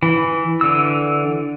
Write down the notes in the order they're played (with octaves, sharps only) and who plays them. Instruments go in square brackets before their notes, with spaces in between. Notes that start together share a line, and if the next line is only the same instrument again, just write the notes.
[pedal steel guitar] E3
D3 E3 E6